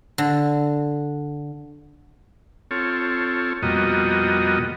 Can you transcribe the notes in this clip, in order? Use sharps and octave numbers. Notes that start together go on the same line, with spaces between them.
D3
C4 F4 A4 C#5
F2 B2 G3 A#3 F#4 D#5